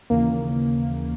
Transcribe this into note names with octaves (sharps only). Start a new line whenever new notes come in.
D#2 C#3 E3 A#3